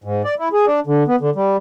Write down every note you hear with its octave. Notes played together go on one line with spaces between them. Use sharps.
G#2
D5
E4
G#4
D4
D3
B3
D3
G3